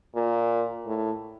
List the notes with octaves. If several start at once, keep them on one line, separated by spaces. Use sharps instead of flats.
A#2
A2